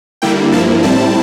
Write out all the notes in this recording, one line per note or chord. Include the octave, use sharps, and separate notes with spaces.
D3 G3 A#3 E4 G5
G2 F3 A#3 E4 A5
A2 G3 C4 E4 A5